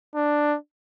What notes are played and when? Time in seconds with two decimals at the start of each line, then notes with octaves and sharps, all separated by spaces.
0.15 D4